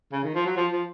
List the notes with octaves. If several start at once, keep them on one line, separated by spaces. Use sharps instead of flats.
C#3
D#3
F3
F#3
F3
F3